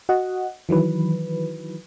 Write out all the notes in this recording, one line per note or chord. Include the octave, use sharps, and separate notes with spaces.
F#4 D#5 F#5
D#3 E3 F#3 B4